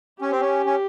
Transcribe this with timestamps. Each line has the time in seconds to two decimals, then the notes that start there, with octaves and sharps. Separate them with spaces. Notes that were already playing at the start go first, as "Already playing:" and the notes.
0.21 C#4 G4
0.31 C4
0.40 C#4
0.66 C#4